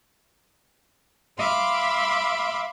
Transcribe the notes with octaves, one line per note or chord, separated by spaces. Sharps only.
E5 F5 B5 C6 D6